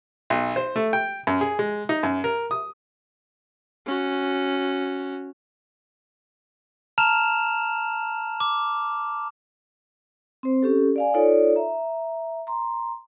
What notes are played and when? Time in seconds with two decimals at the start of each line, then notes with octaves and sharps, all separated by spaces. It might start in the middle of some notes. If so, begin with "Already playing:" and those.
0.30 B1
0.56 C5
0.76 A3
0.93 G5
1.27 F#2
1.41 G#4
1.59 G#3
1.89 D#4
2.03 F#2
2.24 A#4
2.51 D#6
3.86 C#4 F#4
6.98 A5 A#5 F6 E7 F7
8.40 D6
10.43 C4 C5
10.63 C#4 G4 A4
10.96 D5 F5 G#5
11.14 D#4 F4 A4 C#5 D5
11.56 E5 A#5
12.47 A#5 C6